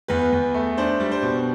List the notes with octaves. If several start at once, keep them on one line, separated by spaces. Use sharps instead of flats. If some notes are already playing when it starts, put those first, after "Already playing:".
E2 B4
E2
A3
D4 C5
G3
C5
B2